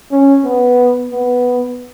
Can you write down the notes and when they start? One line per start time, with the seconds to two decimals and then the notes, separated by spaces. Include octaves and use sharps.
0.11 C#4
0.45 B3
1.11 B3